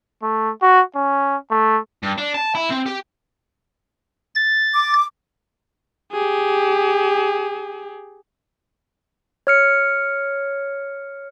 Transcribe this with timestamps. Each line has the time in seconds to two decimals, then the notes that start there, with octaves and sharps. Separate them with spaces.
0.23 A3
0.62 F#4
0.95 C#4
1.51 A3
2.03 G2
2.18 D4
2.35 A5
2.55 E4
2.70 C4
2.86 G4
4.35 A6
4.74 D6
6.12 G4 G#4
9.47 C#5 F6 C#7